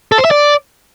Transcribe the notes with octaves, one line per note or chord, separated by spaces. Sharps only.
A4
C5
E5
D5